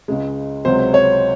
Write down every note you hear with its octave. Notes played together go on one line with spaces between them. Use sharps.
C#2 C#3 G#3
C#2 C3 F#3 C5
C#5